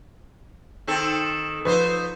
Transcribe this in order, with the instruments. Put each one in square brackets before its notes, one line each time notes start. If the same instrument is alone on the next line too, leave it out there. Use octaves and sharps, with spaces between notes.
[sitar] D#3 C4 A4
[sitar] F3 D#4 C5 [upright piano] B4